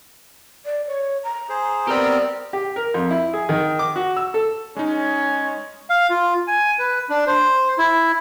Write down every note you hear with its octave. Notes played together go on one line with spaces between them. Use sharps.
D5
C#5
A#5
G#4 C5
B3 C4 G4 A#4 D5
G4
A#4
F2
E4
G#4
D#3
D6
F#4
E6
A4
G#3 C#4 D#4
F5
F4
G#5
B4
D4
C5
E4